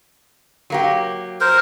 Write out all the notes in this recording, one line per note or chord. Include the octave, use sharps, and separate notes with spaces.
F#3 A#3 G4
A#4 C5